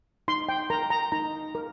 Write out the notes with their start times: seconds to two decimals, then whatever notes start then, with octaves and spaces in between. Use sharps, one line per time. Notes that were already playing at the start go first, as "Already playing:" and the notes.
0.28 D#4 C6
0.49 G5
0.70 A#4 A#5
0.90 A#5
1.12 D#4 A#5
1.55 A#4